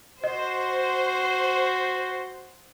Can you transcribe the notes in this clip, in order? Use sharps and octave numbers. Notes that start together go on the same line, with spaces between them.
F#4 C5 D#5